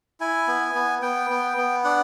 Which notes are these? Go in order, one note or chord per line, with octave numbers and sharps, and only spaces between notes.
E4 G#5
B3
B3
B3 G5
B3
B3
D4 F#5